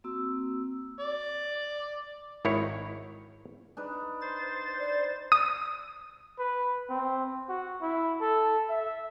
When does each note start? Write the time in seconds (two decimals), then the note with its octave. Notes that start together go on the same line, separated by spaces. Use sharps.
0.04 A#3 C4 F#4 E6
1.00 D5
2.45 G#1 D#3 E4 C#5
3.77 D4 D#4 B4
4.21 C5 A6
4.80 D5
5.32 D#6
6.39 B4
6.90 C4
7.49 F#4
7.82 E4
8.21 A4
8.70 E5